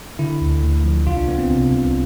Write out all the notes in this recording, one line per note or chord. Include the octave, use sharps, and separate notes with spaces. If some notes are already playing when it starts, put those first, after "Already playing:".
D3 E4
D2
D2
F3
C2 F4
D4
C2 B3
C4
C3
C2